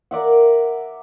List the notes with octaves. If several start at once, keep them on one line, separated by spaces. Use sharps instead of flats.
A#4 D5 E5 F#5